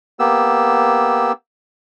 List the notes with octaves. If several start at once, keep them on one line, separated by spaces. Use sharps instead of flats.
A#3 B3 G4 E6